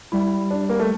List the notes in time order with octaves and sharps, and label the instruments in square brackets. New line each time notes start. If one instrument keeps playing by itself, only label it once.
[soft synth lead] G3 [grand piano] E4
[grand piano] D4
A#3
A3